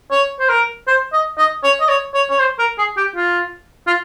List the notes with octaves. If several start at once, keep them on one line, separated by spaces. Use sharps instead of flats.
C#5
C5
A#4
C5
D#5
D#5
C#5
D#5
C#5
C#5
C#5
C5
A#4
G#4
G4
F4
F4